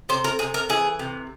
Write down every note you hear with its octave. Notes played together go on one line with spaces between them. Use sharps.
C3 C5
A#4
C3 G#4
A#4
E3 G#4
C3